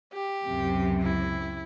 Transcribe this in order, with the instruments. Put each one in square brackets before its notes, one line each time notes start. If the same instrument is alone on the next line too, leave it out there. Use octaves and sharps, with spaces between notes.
[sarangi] G4
[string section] C#2 F#2 C3
[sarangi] E4